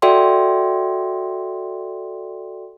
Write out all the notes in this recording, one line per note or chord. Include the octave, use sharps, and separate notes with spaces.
F#4 A4 D5 E5 G5 C6